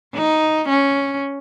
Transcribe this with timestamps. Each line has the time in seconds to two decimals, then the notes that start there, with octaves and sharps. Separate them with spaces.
0.15 D#4
0.69 C#4